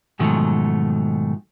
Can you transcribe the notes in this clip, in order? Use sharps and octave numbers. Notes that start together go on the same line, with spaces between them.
G#2 B2 D#3 F3 F#3 A3